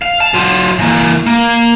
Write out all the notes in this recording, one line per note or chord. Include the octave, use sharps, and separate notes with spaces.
F5
A5
F#3 F4
E3 A#3
A#3